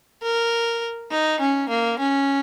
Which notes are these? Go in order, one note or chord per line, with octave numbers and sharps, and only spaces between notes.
A#4
D#4
C#4
A#3
C#4